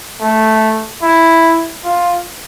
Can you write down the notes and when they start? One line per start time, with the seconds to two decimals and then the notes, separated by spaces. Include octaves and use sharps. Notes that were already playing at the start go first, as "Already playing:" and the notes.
0.21 A3
1.03 E4
1.84 F4